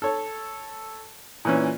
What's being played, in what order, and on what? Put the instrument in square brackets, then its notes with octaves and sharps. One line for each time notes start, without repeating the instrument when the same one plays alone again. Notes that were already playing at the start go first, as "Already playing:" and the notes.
[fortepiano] A4 C#5
A#2 E3 C#4